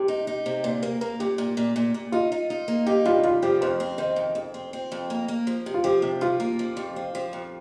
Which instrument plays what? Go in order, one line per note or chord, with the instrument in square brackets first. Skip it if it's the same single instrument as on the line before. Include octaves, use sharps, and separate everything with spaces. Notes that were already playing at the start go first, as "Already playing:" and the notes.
Already playing: [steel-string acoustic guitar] C3 [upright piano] G4
[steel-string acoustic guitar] D#4
D#4
C3
[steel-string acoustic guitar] A#2 [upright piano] C5
[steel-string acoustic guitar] A#3 [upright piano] A#4
[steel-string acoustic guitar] A#3 [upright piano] A#4
[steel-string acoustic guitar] A#2 [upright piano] G4
[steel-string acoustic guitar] A#2
A#2
A#2
A#2
[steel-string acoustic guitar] D#4 [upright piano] F4
[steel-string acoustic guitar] D#4
D#4
A#3
[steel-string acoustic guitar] D#4 [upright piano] G4
[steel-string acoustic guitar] G2 [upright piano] F4
[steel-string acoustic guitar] G2 [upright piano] F4
[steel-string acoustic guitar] F3 [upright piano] G4
[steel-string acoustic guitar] F2 [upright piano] C5
[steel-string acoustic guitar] C4
[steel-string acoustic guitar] D#3 [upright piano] C5
[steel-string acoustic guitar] F2
F2
C4
C4
F2
A#3
A#3
F3
C3
[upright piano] F4
[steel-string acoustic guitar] F3 [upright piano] G4
[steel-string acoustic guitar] C3
[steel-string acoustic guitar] F3 [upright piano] F4
[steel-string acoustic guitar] A#3
F3
F2
C4
F3
F2